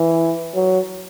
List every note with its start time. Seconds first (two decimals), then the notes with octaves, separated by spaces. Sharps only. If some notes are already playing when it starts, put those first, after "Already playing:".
Already playing: E3
0.55 F#3